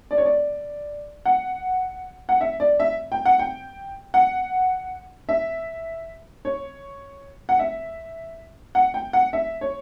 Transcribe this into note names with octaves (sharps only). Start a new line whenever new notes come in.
D5
C#5
D5
F#5
F#5
E5
D5
E5
G5
F#5
G5
F#5
E5
C#5
F#5
E5
F#5
G5
F#5
E5
C#5